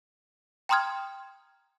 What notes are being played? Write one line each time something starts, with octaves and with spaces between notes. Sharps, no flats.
G5 A#5 C6 D#6 F6 G#6